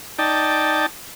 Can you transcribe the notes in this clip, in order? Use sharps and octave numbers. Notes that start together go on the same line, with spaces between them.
D#4 D5 G5 A5